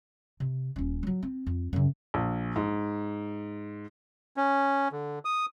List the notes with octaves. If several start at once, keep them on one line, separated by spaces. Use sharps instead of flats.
C3
D#1 C#4
F#3 G3
C4
F2
F#2 C#3
A#1
G#2
C#4
D3
D#6